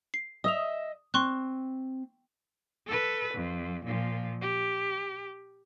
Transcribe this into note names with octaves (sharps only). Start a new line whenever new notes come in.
C7
D#5 E5 D#6 F7
C4 C6 C#6 F#6
A4 B4
F2
A#2 F3
G4